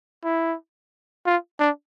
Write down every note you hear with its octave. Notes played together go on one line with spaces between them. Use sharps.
E4
F4
D4